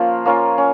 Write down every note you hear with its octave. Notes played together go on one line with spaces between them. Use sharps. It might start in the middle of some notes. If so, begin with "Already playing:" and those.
Already playing: F3 A#3 C#4 F4
A#3 C#4 F4
C#4